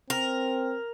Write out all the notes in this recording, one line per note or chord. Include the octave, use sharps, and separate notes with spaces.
C4 A#4